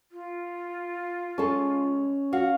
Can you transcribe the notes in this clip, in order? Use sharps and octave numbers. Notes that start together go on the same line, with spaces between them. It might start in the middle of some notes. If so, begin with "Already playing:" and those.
F4
G#3 C#4 A4
F#4 F5 F#5